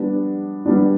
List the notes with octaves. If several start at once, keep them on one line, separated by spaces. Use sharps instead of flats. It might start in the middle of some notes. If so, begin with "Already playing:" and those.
Already playing: G3 B3 D4
G3 B3 D4